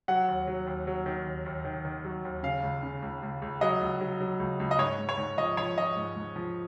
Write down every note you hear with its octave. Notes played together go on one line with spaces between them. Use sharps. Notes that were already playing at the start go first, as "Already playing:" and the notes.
F#3 F#5
D#2
F#3
D#2
F#3
D#3
D#2
D#2
D#3
D#3
F#3
D#2
C#3 F5
C#2
C#3
C#2
C#2
C#2
F#3 D#5
C#2
F#3
F#3
C#2
C#2
D#5
G#2 C#5
G#2
C#5
G#2
F3 D#5
F3 C#5
F3 D#5
G#2
G#2
F3